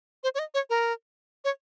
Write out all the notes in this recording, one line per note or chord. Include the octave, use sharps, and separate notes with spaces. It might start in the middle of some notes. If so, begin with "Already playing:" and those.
C5
C#5
D#5
C#5
A#4
C#5